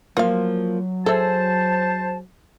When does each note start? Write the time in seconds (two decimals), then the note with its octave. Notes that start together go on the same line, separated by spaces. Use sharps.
0.17 F3 F#3 A#3 F4 F5
1.06 G#4 A4 C5 E5 A5